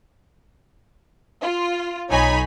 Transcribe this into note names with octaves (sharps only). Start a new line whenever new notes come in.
F4
B1 D#4 C#5 G#5 B5